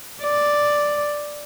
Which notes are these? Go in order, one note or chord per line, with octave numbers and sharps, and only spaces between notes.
D5